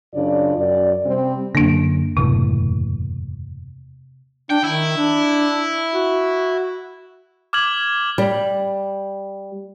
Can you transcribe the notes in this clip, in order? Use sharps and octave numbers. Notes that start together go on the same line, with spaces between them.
F#2 C#3 D4 F4 D5
F#2 D5
C3 G3 C4
F#2 D3 A#3 D4
F#1 E2 A2 C3
D4 G5
D#3 E4
D4
F#4
D6 F6 G#6 F#7
G3